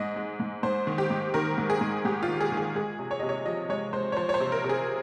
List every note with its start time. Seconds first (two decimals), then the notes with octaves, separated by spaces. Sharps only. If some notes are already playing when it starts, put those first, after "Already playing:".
Already playing: G#2 D#5
0.16 G#3
0.40 G#2
0.63 G#2 C5
0.87 D#3
0.98 G4
1.10 G#2
1.34 D#3 A#4
1.58 G#2
1.70 G#4
1.81 G#2
2.05 G#2 G4
2.23 F4
2.28 D#3
2.40 G#4
2.52 D#3
2.57 G#4
2.75 G#3 G#4
2.99 C3
3.11 C#5
3.19 C3 D#5
3.29 C#5
3.46 F3 D#5
3.69 G#3 C#5
3.93 G#3 C5
4.12 C#5
4.17 F3 C5
4.29 C#5
4.34 C5
4.40 C3
4.52 A#4
4.64 C3
4.69 G#4